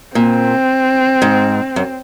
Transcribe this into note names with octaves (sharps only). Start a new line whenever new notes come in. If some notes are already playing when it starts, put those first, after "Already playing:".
A#2 C4
G#2
F#2